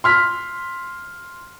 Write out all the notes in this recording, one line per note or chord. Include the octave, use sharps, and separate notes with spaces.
C6 F6 B6